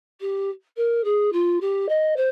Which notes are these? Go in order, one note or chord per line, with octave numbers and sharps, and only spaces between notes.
G4
A#4
G#4
F4
G4
D#5
C5